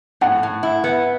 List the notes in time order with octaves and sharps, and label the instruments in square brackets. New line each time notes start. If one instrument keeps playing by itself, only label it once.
[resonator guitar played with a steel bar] A2 [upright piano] F#5
[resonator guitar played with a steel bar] A2
E4
B3